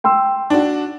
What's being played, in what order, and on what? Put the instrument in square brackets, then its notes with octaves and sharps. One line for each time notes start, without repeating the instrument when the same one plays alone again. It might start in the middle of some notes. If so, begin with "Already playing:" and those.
[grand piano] G5 C6 E6
[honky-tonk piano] D4 F#4